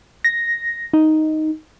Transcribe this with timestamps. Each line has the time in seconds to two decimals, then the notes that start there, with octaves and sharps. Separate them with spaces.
0.24 A#6
0.93 D#4